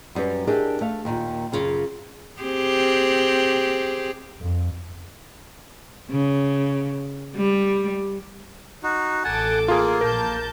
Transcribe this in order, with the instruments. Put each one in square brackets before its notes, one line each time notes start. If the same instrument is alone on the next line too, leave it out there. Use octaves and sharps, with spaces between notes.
[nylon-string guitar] F#2 G3 C#4 B4
D4 E4 G4 G#4 A#4 D#5
A3 F5
D#2 A#2
F#2 C#3 F4
[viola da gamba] C4 G4 G#4
[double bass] F2
[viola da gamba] C#3
G3
[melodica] D#4 F#4
[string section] A1 A4 D6 [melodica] F#5 G#5 A5
[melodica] A#3 [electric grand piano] F4 G#4
[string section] A#1 A5 G6 [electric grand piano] A#4